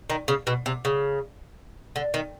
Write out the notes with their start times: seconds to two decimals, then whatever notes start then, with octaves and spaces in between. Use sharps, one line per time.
0.10 D#3
0.28 C#3
0.47 B2
0.66 C3
0.85 C#3
1.96 D3
2.14 D#3